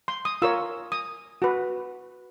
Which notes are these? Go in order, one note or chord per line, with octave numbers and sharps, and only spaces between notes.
C6
D#6
F4 A#4 C#5 E6
D#6
F#4 B4